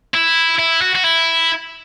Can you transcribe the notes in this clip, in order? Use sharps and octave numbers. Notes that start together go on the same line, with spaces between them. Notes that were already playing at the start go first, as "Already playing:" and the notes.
E4
E4
F#4
F#4
E4